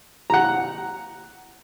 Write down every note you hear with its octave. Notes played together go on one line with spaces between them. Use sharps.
F#5 A#5